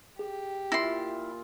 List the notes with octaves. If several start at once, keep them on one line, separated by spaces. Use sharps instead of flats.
G4 G#4
A#2 E4 F4 E5 G5 C6 A#6